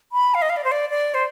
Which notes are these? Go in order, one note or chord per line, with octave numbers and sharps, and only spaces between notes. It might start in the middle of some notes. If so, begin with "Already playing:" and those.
B5
F5
D#5
F5
D5
C5
D5
D5
C5